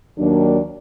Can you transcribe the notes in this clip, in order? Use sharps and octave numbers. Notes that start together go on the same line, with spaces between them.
D#2 D#3 F#3 A#3 D4